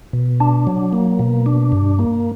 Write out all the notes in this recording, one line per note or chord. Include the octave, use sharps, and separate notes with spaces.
B2
D4
F#3
A#3
B2
D4
G2
A#3